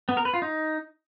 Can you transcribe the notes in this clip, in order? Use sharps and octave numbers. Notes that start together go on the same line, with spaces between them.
B3
A#4
B4
F4
D#4